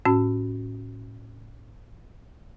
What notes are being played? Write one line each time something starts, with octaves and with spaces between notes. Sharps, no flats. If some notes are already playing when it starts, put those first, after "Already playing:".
A2 C#4 F#4